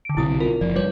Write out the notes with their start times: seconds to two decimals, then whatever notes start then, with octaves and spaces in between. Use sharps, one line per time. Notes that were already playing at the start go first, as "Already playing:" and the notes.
0.05 D3 D7
0.17 B1 C3 E4 D#6
0.40 F4 A#4
0.61 F#1 F3 D5
0.76 G3 B4 C#5